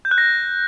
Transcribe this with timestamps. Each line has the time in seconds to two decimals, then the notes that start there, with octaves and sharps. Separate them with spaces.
0.05 G6
0.11 F#6
0.18 A#6